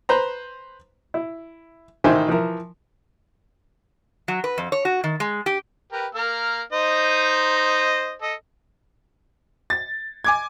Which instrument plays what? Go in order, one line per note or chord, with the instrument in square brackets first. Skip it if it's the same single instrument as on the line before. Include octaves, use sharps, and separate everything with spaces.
[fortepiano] B4 C5 A#5
E4
A1 D#3 D#4 C5 E5 G#5
E3 F3 A#4 E5
[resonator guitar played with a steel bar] F#3
B4
F2
C#5
F#4
D#3
G#3
G4
[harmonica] G4 A#4 B4
A#3 A#4 F6
D#4 C5 D#5
A4 D#5
[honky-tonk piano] A6
G#5 D6 G#6